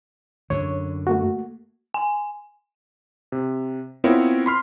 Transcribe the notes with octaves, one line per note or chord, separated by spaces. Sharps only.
F#2 D3 C#5
A3 A#3 F#4
G#5
C3
B3 C4 E4 F4 A#4 C#5
B5 C6 F6